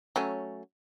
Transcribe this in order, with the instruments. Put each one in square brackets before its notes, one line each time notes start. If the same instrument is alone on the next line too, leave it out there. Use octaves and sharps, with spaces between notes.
[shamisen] F#3 A3 C#4